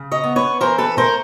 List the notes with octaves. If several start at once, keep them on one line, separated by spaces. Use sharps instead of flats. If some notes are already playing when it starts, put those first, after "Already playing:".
Already playing: C#3
C#5 D#5
B3
B4 C#5
E3 A#4 C5
A4 B4
A3 A#4 C5